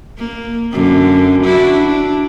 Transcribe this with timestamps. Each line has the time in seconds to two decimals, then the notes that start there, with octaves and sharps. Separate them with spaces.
0.18 A#3
0.72 F#2 D3
1.44 D4 E4 F#4
1.85 D4